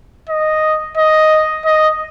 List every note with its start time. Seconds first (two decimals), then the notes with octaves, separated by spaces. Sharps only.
0.30 D#5
0.97 D#5
1.65 D#5